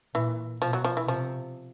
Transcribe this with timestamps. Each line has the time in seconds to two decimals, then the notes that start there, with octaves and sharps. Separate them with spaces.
0.14 A#2 E3
0.62 B2 F3
0.73 F#3
0.84 F3
0.97 E3
1.07 C3 F3